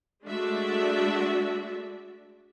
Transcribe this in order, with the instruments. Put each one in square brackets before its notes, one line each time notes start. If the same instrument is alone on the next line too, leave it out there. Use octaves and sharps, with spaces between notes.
[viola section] G#3 A3 D4 F#4 D5 E5